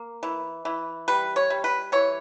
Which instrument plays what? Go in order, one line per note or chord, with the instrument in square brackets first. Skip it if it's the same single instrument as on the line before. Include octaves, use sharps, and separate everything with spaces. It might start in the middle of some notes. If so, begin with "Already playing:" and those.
Already playing: [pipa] A#3
E3
E3
G3 B4
C#5
G3
B4
E3 C#5